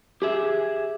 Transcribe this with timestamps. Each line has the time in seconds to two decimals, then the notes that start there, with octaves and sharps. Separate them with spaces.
0.22 G4 G#4 E5